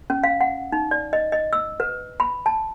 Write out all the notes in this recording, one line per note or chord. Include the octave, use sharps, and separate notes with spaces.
C#4
F5
F#5
D#4
D5
D#5
D#5
E6
B4
B5
A5